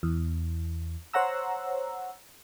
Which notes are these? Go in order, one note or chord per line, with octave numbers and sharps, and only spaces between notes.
E2
C5 C#5 F#5 A#5 E6